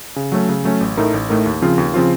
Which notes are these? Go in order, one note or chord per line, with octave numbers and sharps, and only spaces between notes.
C#3
F#3 A3 C#4
C#3
F#3 A3 C#4
A1
A2 A3 D#4 A#4
A1
A2 A3 D#4 A#4
D#2
C#3 F3 C4 F4
D#2
C#3 F3 C4 F4